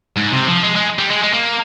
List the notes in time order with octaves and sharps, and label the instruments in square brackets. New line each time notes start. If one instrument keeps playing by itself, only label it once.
[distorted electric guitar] G#2
C3
F3
G#3
G#3
G3
G#3
G#3
A#3